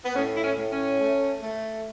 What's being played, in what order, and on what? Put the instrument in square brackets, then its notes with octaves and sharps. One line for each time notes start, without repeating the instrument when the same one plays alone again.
[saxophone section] B3
A2 C#4
E4
C#4
A2
C#4
A3
A3